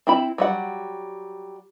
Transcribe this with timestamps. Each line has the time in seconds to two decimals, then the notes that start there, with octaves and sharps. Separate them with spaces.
0.07 C4 E4 B5
0.38 F#3 G3 F#5